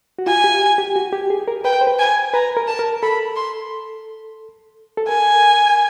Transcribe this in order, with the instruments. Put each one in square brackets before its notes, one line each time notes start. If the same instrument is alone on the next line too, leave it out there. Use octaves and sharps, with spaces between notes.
[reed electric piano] F#4
[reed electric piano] F4 [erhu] G#5
[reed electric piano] G4
G4
F#4
G4
G#4
A#4
[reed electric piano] B4 [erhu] G5
[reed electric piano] C5
B4
[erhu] G#5
[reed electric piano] B4 [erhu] A#5
[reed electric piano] A#4
[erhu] A5
[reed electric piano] A#4
[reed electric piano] A4 [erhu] B5
[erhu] C6
[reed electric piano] A4
[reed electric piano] A#4 [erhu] G#5